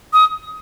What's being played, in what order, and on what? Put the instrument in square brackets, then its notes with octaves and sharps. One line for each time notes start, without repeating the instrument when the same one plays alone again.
[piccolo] D#6